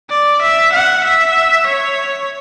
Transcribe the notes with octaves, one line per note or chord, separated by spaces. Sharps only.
D5
E5
F#5
E5
C#5